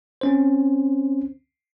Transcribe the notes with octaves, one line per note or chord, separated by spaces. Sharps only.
C4 C#4 C5